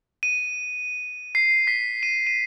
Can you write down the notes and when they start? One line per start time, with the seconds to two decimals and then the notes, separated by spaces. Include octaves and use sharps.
0.23 D#7
1.35 C7
1.67 B6
2.03 D#7
2.27 D#7